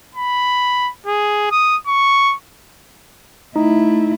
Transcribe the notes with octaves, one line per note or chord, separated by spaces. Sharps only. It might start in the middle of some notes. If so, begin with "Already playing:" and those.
B5
G#4
D#6
C#6
A3 D#4 E4